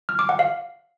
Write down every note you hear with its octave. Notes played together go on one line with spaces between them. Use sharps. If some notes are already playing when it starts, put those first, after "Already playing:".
F6
D6
F#5
F5